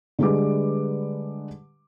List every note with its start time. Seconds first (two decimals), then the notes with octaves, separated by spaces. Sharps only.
0.19 D3 G3 G#3 B4 D6